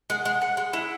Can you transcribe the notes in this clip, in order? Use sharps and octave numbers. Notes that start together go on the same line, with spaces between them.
G#3 F#5
G#3
F#5
G#3
G#3 E4